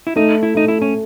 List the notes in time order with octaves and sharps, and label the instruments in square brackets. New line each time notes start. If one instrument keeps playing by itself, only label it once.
[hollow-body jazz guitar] E4
[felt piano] A3 [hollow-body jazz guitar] D#4
[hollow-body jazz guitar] E4
[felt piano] A3 [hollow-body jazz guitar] D#4
[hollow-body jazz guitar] E4
C#4